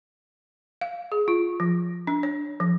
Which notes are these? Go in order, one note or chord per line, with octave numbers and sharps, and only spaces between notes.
F5
G#4
F4
F3
D4
C#5
F3